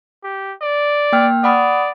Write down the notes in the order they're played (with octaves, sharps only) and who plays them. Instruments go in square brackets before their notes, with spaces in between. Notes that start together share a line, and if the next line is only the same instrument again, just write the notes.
[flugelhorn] G4
D5
[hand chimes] A#3 G5 F6
[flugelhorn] D5 [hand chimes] F#5 B5 D#6